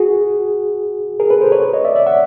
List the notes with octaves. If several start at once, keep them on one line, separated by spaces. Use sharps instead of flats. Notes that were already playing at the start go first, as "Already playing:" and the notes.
Already playing: F#4 G#4
G#4 A#4
A4 B4
A#4 C5
B4 C#5
C#5 D#5
D5 E5
D5 E5
E5 F#5